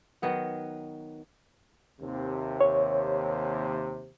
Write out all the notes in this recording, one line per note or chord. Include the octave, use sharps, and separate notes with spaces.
D#3 F#3 B3 F#5
D#2 C3
C#5